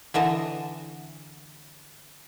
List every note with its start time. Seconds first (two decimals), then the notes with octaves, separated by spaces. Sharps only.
0.14 D3 E3 D#5 A5